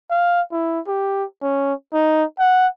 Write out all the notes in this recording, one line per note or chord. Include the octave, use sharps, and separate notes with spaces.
F5
E4
G4
C#4
D#4
F#5